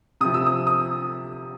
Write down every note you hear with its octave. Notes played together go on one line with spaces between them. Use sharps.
C3 F3 D#6
E6
D#6
D#6